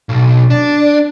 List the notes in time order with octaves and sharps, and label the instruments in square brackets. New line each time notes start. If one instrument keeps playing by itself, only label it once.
[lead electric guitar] B1
D4